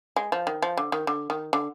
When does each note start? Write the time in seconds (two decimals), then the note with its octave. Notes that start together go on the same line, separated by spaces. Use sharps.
0.16 G#3
0.32 F3
0.47 D#3
0.62 F3
0.77 D3
0.92 D#3
1.07 D3
1.30 D#3
1.53 D3